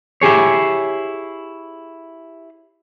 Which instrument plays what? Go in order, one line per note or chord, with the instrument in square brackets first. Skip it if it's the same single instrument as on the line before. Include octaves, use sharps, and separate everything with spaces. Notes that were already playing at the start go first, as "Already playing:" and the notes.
[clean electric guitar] E4 G4 G#4 C#5